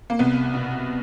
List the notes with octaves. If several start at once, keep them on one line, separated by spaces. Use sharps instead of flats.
A#3
C2 B3
B2